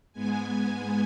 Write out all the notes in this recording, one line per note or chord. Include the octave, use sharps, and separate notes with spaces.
G#2 G#3 B3 G#5